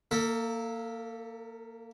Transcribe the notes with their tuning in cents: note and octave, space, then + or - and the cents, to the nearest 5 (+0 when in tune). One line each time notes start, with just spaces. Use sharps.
A#3 -10 A4 +35 E5 -15